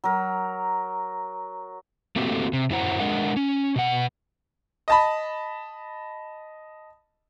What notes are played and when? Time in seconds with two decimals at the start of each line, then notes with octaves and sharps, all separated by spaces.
0.04 F#3 A#4
2.16 A3 A#3 C4 F#4 G4 A4
2.53 C3
2.70 F#2 F#3 E4 C5 F#5 A#5
3.00 G#3 D4 A#4 D#5 F#5
3.36 C#4
3.76 B2 F#5
4.88 D#5 A5 B5